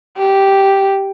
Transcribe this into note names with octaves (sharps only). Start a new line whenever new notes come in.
G4